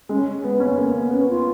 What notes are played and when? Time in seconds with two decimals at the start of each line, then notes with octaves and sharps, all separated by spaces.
0.09 G#3 C#4
0.44 G#3 B3
0.60 A#3 C#4
0.77 A#3 C#4
0.95 B3
1.11 B3 C#4
1.29 F4